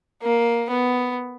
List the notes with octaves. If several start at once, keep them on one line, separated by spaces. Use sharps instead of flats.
A#3
B3